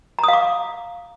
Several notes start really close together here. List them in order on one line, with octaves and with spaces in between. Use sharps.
A#5 D#6 F5 D6